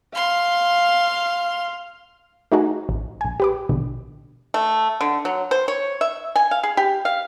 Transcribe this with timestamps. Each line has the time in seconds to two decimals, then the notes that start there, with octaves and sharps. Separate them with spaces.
0.15 F5 C6
2.52 A3 D#4 F#4 G#4 A#4
2.89 A1
3.21 A#1 G#5
3.40 G4 B4 D6
3.69 A#1 B2 D3
4.54 A3
5.01 D3
5.25 F#3
5.51 C5
5.68 C#5
6.01 E5
6.36 G#5
6.51 F5
6.63 G#4
6.77 G4
7.05 F5